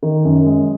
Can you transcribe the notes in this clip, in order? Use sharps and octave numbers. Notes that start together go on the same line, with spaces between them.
D#3
F#2
G#3